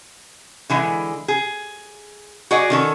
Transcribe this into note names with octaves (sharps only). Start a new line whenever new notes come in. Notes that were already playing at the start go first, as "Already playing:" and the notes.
D3 E3 G#3
G#4
F#4 G#4 D5 D#5
D#3 C#4 A4